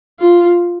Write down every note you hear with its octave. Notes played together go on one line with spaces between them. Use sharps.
F4